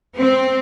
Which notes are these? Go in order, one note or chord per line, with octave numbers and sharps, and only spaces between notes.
C4